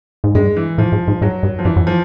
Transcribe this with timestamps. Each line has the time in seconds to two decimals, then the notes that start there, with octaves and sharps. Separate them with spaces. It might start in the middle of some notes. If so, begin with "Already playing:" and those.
0.24 G#2
0.35 G2 G#3
0.56 E3
0.78 A2 F3
0.92 G#2
1.08 G#2
1.21 G#2 F#3
1.43 G2
1.59 F3
1.65 G2 E3
1.76 F#2
1.87 F3